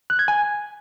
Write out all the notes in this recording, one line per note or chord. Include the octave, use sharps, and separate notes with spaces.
F#6
G#6
G#5